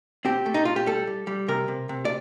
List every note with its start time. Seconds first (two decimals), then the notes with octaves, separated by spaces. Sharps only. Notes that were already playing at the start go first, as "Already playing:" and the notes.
0.25 C4 G4
0.46 A3
0.54 D#4
0.65 A2 F4
0.76 G4
0.86 G3 A4
1.07 G3
1.27 G3
1.48 C3 A#4
1.68 C3
1.89 C3
2.05 D5